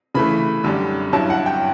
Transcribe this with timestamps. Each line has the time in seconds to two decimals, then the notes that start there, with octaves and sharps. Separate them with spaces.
0.14 C#3 E3 A3 B5
0.64 F#2 D3 G3 D4
1.13 G2 F#3 C#4 E4 A5
1.30 F#5
1.46 G5